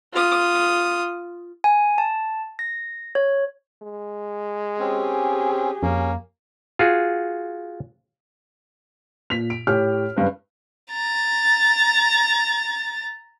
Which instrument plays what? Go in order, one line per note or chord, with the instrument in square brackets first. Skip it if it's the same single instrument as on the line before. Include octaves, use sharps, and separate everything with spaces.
[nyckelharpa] F4 D#6
[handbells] G#5
A5
A#6
C#5
[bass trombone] G#3
[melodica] C4 C#4 [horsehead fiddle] G4 G#4
[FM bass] F2 [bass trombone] A#3 [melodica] C#4
[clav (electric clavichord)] F4 F#4 G#4
[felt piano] A#2 [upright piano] B6 F7
[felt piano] D7
[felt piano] A2 C#5 F6 [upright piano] G4
[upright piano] F#1 G2 B4
[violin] A#5 A6